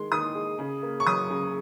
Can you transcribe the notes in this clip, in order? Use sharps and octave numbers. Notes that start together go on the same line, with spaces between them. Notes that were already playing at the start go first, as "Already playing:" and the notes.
Already playing: D#3 G#3 C6
D#3 D#6
G#3
C#3
A#3
C#6
F#3 D#6
C#3